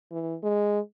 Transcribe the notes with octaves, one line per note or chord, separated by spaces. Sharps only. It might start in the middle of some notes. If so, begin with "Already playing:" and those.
E3
G#3